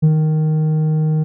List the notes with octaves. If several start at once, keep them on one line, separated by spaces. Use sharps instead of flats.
D#3